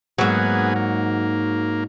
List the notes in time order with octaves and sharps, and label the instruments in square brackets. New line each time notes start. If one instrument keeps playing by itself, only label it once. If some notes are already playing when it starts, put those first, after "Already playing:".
[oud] G#2 F#3 [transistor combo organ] A#3 B3 G#4
[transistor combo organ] A#3